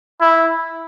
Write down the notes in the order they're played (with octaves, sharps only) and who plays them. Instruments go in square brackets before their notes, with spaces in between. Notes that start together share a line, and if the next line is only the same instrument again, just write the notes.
[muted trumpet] E4